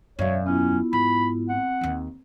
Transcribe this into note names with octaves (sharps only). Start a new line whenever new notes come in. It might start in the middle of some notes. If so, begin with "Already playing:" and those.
E1 F#2 C#5 D5 E5 F5
B3 C#4 E4 F4
G#2 B5
C4 F#5
D#2 D#3